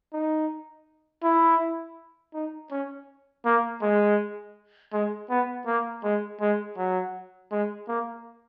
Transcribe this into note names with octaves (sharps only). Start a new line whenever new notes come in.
D#4
E4
D#4
C#4
A#3
G#3
G#3
B3
A#3
G#3
G#3
F#3
G#3
A#3